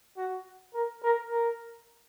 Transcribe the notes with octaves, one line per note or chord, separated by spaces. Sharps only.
F#4
A#4
A#4
A#4